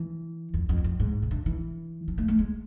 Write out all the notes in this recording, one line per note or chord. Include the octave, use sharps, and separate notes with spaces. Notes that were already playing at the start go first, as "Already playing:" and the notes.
Already playing: E3
F2
F2
F2
G#2
C3
D3
E3
F3
A3
A3
G#3